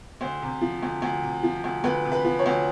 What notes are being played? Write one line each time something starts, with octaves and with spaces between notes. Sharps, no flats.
D2 C5
C3
F3
D2
D2
C3
F3
D2
D2 B4
C3
B4
F3
C#5
D2